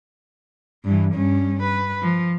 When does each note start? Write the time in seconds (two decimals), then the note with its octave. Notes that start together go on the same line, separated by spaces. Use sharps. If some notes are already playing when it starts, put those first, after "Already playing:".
0.85 G2 E3
1.14 G2 C#4
1.63 B4
2.02 F3